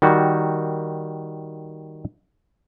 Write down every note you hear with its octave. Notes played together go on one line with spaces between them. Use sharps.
D#3 G3 F#4